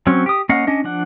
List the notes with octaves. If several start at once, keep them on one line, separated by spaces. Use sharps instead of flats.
F#3 C4 C#4
G4 D#6
A#3 C#4 D#5 F5 F#5
C#4 D4 D#5
F3 D4 F#5